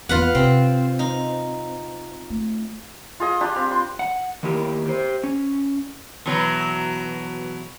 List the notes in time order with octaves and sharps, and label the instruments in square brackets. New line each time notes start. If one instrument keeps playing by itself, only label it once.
[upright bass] E2 B3 [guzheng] F4 B4 F#5
[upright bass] C3 [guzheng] C4
[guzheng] D#4
[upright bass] A3
[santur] F4 G#4 D#5
G3 D4 F4 G4
C4
C6
[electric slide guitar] F#5
D#3 A#3 E4 G4 A#4
G4 C5
C#4
[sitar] B2 E3 F#3